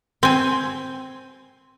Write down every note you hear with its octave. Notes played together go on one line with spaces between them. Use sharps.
C4 G#5